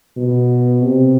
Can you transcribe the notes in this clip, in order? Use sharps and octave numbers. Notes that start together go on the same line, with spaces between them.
B2
C3